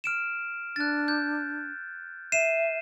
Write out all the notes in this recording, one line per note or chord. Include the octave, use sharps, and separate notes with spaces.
F6 D7 E7
D4 F#6 A6
G6
E5 C7 D#7 E7